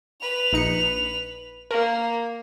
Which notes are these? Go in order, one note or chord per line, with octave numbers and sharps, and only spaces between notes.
B4 F7
A#1 D#4 C#7
A#3 A#4